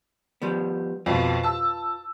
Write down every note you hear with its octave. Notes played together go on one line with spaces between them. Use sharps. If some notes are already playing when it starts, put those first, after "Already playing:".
F3 G3 B3
F2 B2 F4 B4
A5 E6